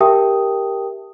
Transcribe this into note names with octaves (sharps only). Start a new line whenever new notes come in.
G4 A#4 E5 G5 A5 D#6